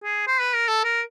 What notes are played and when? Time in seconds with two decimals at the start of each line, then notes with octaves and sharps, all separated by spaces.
0.04 G#4
0.27 C5
0.40 B4
0.54 A#4
0.68 A4
0.85 A#4